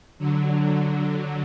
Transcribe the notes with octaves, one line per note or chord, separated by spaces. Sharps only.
D3 F#3